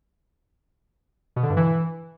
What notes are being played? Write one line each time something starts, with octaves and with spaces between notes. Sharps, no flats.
B2
D3
G2
E3